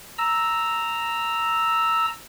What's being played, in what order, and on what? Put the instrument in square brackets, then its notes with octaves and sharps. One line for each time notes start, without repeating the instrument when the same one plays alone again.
[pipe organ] A#5 E6